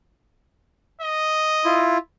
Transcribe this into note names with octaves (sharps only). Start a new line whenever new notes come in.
D#5
E4 F4